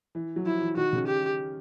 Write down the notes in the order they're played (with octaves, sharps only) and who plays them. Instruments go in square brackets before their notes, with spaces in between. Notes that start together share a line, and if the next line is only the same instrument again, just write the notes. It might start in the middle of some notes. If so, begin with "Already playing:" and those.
[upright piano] E3
F#3
[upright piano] F3 [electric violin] E4
[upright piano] E3
[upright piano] D#3 [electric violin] F#4
[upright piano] C#3
[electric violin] G4